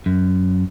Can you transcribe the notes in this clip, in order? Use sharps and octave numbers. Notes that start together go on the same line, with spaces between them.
F#2